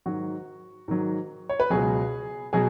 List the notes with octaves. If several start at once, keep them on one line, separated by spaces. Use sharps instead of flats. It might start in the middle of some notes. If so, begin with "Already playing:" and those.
G#2 D#3 F#3 F#4
G#2 D#3 F#3
C#5
B4
C#2 B2 F#3 G#4
B2 F#3 G#4